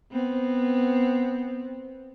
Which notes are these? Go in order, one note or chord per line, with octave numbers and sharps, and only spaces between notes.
B3 C4